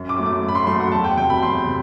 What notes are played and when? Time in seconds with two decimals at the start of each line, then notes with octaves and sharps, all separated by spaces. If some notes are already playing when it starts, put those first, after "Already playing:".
Already playing: F#2
0.09 D6
0.18 F#3 A3
0.26 D6
0.42 F#2
0.48 B5
0.55 C6
0.67 F#3 A3 C6
0.80 F#5
0.92 E2 A5
1.04 G5
1.17 C3 F#3 G5
1.30 B5
1.41 E2 C6
1.67 C3